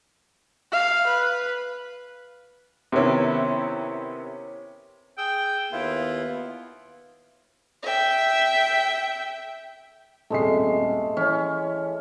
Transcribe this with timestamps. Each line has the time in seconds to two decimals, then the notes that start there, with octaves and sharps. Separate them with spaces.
0.72 F5
1.07 B4
2.92 C3 D#3 B3 C#4 E4
5.18 G#4 G5 D#6 E6
5.72 D#2 B3 E4 F4
7.83 E5 G5
10.30 D#1 G#1 G#3 A3 C7
11.17 E3 C#4